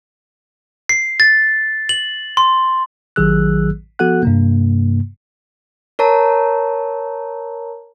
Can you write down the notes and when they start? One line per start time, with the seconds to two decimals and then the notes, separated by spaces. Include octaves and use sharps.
0.89 C7
1.20 A6
1.89 F#7
2.37 C6
3.16 A1 D#3 F#3 G#4 E6 F#6
3.99 F3 B3 F#4 A4 F#5 F#6
4.23 G2 C3 A#3
5.99 A#4 C#5 A5 A#5